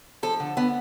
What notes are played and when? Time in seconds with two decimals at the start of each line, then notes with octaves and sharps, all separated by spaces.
0.23 F3 A4
0.40 D3
0.57 D3 B3